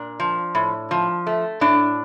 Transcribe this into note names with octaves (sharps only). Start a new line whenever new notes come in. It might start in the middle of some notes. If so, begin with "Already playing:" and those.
Already playing: A#2 D4
F3
A2
F3
A3
A2 D4